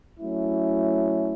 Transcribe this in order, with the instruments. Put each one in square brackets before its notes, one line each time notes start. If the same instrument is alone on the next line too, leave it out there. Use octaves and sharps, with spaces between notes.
[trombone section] F#3 A3 C#4 E4